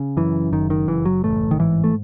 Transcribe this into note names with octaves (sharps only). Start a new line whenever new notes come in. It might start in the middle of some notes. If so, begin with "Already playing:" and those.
Already playing: C#3
F#2 E3
F#1 D#3
D#3
F#1 E3
F#3
A1 A3
D#3
G#2 E3
A3